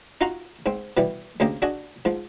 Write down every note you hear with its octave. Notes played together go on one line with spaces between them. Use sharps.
D#4 F4 F#4 A#5 C6
G#2 C4
B2 E3 G3
D2 C#3 A#3 G4 D#5
D4 F#4 G#4 D#5
G#2 F3